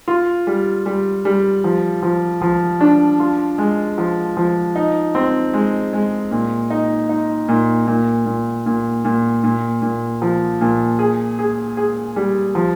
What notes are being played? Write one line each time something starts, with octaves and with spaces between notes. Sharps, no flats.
F4
G3
G3
G3
F3
F3
F3
D4
F4
G#3
F3
F3
D#4
C4
G#3
G#3
A#2
D#4
D#4
A#2
A#2
A#2
A#2
A#2
A#2
A#2
F3
A#2
G#4
G#4
G#4
G3
F3